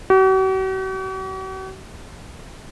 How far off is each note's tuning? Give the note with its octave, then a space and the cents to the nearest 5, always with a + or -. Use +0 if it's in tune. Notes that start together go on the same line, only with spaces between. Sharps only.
F#4 +45